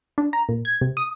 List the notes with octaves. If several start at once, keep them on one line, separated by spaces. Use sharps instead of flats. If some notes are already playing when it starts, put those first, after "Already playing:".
D4
A#5
A#2
G#6
C3
D#6